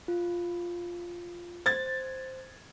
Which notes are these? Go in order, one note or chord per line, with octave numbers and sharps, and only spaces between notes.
F4
C5 G#6 A6